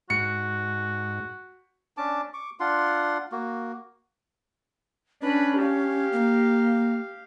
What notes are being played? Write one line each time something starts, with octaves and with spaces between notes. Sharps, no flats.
G#2 F#4 C#7
C#4 D4 A5 D6
C#6 D6
D4 F4 F#5 C6
A#3 F#4
C#4 D4 B4
G4 F5
A#3